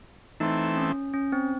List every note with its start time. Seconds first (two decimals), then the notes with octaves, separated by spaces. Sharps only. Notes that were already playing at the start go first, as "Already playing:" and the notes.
0.40 E3 A3 C4 D#4
0.77 C#4
1.14 C#4
1.32 C4